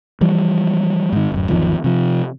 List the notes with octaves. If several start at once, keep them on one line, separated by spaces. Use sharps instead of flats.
E3 F3 G3
G#2 D#3
D1 F#2
G#1 E2 D#3 F3
C3 F3